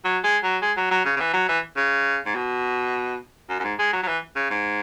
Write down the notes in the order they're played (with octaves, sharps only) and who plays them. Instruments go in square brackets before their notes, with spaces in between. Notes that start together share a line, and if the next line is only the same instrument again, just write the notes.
[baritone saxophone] F#3
G#3
F#3
G#3
F#3
F#3
C#3
C#3
E3
F#3
E3
C#3
G#2
B2
F#2
F#2
G#2
G#3
F#3
F#3
E3
C#3
G#2